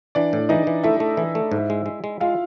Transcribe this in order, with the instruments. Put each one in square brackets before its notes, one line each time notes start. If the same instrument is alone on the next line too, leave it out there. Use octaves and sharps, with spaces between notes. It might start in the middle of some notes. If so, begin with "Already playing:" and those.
[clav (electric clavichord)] E3 [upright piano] D4 D5
[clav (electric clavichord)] A2
[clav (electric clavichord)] E3 [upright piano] D#4 D#5
[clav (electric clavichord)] E3
[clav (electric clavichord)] A3 [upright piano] E4 E5
[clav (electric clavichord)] A3
E3
A3
G#2
G#3
G#3
G#3
[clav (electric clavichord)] G#3 [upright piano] F4 F5